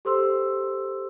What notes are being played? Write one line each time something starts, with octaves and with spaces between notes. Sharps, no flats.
G4 A4 C5 C6 E6